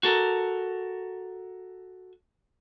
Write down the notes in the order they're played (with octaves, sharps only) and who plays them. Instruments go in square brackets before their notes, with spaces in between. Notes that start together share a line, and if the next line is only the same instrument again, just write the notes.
[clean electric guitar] F#4 A4 A#4